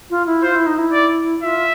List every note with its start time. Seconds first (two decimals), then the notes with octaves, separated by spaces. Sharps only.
0.10 F4
0.26 E4
0.43 F4 C5
0.55 E4
0.67 D#4
0.78 E4
0.93 D5
1.43 F4 E5